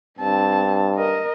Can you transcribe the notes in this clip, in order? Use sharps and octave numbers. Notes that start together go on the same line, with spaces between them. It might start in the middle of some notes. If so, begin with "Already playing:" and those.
G2 C4 A5
A#4 D#5